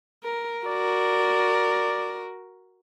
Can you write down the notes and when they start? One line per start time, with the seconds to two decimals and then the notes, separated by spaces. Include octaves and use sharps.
0.24 A#4
0.66 F#4 A#4 D5